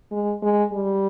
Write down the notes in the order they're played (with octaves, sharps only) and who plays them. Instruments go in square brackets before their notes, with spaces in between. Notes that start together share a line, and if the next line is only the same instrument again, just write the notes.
[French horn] G#3
G#3
G3